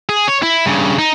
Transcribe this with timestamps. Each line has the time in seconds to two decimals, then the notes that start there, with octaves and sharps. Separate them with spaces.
0.09 G#4
0.28 C#5
0.42 E4
0.66 G2 C#3
0.99 D#4